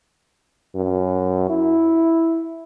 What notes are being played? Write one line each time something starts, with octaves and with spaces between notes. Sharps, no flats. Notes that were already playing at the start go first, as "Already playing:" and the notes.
F#2
E4